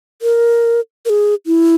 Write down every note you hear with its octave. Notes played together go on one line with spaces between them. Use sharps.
A#4
A#4
G#4
E4